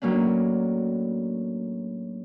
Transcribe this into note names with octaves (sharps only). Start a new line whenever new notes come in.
A2 F#3 A#3 C#4 D4